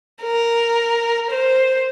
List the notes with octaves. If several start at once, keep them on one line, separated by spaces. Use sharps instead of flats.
A#4
C5